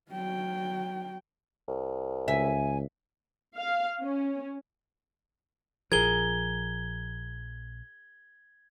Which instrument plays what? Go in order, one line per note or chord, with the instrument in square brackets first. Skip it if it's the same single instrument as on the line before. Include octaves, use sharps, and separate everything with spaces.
[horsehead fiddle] F#3 G5
[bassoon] C2
[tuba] C#2 [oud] E5 [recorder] G#5
[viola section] F5
C#4
[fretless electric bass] A#1 F3 [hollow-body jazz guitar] G#4 A#4 [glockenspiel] G#6 G7